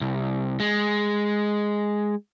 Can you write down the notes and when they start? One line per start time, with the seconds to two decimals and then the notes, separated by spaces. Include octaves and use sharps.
0.01 C2
0.60 G#3